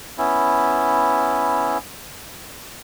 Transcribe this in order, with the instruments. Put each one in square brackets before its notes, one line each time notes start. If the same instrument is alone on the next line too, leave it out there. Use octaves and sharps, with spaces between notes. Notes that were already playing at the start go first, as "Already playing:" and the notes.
[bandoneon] B3 C#4 E4